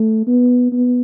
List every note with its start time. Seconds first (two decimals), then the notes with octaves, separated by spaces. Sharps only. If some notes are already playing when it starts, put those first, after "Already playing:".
Already playing: A3
0.27 B3
0.72 B3